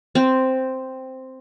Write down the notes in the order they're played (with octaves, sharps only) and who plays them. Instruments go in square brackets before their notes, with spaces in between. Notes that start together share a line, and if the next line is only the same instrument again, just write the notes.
[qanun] C4